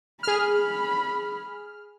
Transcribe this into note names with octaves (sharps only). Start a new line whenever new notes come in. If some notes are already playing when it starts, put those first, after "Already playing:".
G#4 B5 F6